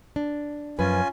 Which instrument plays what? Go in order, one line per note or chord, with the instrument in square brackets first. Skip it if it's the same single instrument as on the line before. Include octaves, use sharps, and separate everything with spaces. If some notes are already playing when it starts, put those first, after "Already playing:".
[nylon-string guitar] D4
[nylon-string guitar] F#2 F3 B4 [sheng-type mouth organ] C#4 F4 G#5